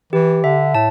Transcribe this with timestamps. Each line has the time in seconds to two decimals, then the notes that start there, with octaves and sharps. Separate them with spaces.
0.13 E3 G4
0.43 D3 E5
0.74 A2 A5